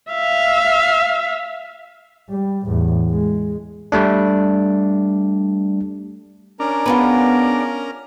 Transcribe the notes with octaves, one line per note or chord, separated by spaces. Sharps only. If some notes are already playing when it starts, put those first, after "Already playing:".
E5 F5
G3
E2 A2
G#3
G3 A3 D4
C#4 D4 A#4 A#5
B3 F4 G#4 B4